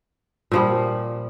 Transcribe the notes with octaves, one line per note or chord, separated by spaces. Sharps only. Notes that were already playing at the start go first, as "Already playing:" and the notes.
A#2 F3 G3